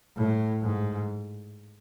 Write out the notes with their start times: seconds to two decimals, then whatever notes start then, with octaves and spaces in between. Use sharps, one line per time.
0.16 A2
0.62 G#2